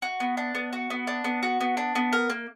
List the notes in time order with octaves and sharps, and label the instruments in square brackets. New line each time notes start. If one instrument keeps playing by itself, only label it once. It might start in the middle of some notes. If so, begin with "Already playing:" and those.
[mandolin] F#4
B3
D4
B3
F#4
B3
D4
B3
F#4
B3
D4
B3
A#4
A#3